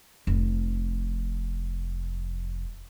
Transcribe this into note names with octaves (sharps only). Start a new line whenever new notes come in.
F1 F3